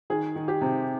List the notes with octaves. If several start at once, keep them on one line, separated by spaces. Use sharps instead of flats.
D#3 G#4
D#3
G4
C3